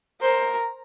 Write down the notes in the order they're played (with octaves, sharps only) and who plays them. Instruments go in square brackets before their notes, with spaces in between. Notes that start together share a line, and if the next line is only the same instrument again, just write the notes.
[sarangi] A#4 [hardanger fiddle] C5